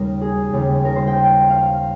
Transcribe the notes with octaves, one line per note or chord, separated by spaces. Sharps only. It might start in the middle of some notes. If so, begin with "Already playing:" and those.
Already playing: D#2 C#3 G3 A#3 A#4
G#4
D#2 C#3 G3 A#3
A#4
C5
G5
F5